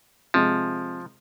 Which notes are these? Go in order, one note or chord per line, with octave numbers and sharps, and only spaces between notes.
C3 F3 G#3